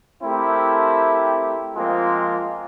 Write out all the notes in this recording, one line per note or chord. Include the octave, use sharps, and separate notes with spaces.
A3 C4 E4 G4 A#4
F3 G#3 A#3 C4 F4